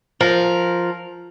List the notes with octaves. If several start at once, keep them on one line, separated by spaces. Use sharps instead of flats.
F3 A#4